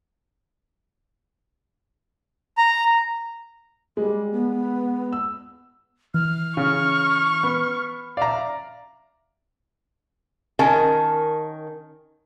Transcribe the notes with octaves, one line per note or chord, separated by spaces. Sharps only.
A#5
G3 G#3
B3
E6
E3 F6
C#3 C#6
B3
D5 E5 F5 A#5
D#3 C#4 A#4 A5